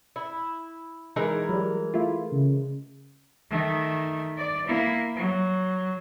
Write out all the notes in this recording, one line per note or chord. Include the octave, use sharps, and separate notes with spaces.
E4
E3 G#3 D#4 A#4
F#3 G3
A3 E4 F4
C#3
D#3 A3
D5
A#3 E4
F#3